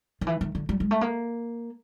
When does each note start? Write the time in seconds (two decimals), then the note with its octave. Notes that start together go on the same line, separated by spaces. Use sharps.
0.21 D#3
0.27 E3
0.41 D#3
0.55 D3
0.69 G3
0.80 G#3
0.91 A3
1.01 A#3